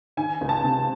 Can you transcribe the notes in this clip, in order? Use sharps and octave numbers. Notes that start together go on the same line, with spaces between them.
D#3 G#5
C#2
A5
C3